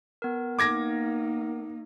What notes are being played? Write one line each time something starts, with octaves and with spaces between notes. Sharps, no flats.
B3 A#4
A#3 D#4 D6 G#6 A#6